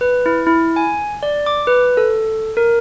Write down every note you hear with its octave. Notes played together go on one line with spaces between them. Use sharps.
B4
E4
E4
G#5
D5
D6
B4
A4
A#4